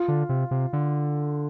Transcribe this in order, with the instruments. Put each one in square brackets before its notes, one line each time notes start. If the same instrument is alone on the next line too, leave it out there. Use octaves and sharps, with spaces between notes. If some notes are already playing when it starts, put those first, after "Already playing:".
Already playing: [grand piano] F4
[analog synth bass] D3
C3
C3
D3